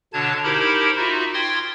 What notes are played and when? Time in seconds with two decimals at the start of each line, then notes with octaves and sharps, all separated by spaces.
0.13 B2 D3 D4 C#5 A5 G#6
0.44 D#4 E4 G4 A#4 C5 B5
0.97 D#4 F4 F#4 E5
1.34 G5 C6 D#6 F6 G#6 A6